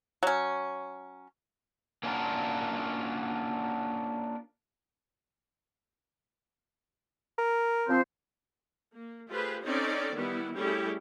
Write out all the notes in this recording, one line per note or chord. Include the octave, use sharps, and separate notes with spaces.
F#3 C#4
A#3 C#4 D4 F4 F#4 A#4
A#4
F3 C4 C5
A#3
A3 F4 G4 G#4 B4 C5
C4 C#4 D#4 A4 C#5 D5
D#3 E3 G3 B3 E4
G3 A3 C#4 E4 G4 G#4